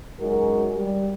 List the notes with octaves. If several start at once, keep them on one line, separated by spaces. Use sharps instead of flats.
F#2 G#3 D#4 F#4 A#4
G3 G4